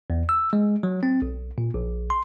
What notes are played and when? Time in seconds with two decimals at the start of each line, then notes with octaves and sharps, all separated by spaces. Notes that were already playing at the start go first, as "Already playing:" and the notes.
0.10 E2
0.29 E6
0.53 G#3
0.83 F#3
1.03 C4
1.22 B1
1.58 A#2
1.74 A#1
2.10 C6